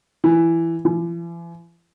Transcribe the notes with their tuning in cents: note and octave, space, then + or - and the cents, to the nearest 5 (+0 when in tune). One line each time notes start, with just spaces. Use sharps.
E3 +10
E3 +45